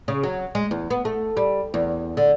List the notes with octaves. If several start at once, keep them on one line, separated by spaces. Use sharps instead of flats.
C#3
F#3
G#3
E2
B3
A3
G3
E2
D3